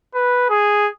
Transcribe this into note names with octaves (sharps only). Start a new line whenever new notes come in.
B4
G#4